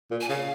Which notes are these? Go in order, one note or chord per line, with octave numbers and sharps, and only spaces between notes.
A#2
G#5
C#3 F5